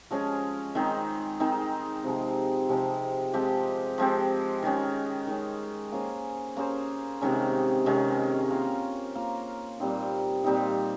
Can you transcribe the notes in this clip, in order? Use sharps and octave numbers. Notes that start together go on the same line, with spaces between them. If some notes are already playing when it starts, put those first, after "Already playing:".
F3 G#3 C#4 G#4
D#3 G#3 C4 D#4
D#3 G#3 C4 D#4
C3 F3 G#3
C3 F3 G#3
F3 G#3 C4 G4
F3 G#3 C4 G4
D#3 G#3 C#4
D#3 G#3 C#4
A#3 C#4 G#4 C5
A#3 C#4 G#4 C5
C3 D#3 G#3 C#4
C3 D#3 G#3 C#4
A#3 F4 A#4
A#3 F4 A#4
A#2 G3 C4 D#4
A#2 G3 C4 D#4